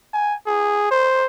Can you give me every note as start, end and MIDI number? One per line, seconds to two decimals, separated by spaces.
0.14 0.34 80
0.47 0.87 68
0.91 1.26 72